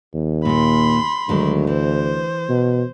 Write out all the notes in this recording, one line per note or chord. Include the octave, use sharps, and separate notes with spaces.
D#2
A#2 A#3 B5 C6
D2 D#3 F#3 G#3
E3 C5
B2